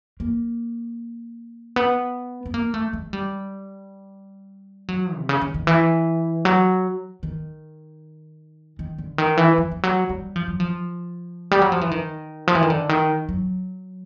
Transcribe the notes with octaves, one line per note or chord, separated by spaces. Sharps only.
A#3
B3
B3
A#3
A3
G#3
G3
F#3
C3
C#3
D3
D#3
E3
F#3
D#3
D#3
D3
D#3
E3
F3
F3
F#3
G3
F3
F#3
F3
G3
F#3
F3
E3
D#3
F3
E3
D#3
D3
D#3
F#3